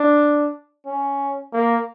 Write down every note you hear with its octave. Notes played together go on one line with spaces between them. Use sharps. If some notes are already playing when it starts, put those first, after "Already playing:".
Already playing: D4
C#4
A#3